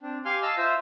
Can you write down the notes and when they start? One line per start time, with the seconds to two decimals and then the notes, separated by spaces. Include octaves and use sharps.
0.01 C4 D4
0.25 G4 F5 G#5 C6 F6
0.42 D#5 F5 A5 E6 F6
0.58 F4 C5 E5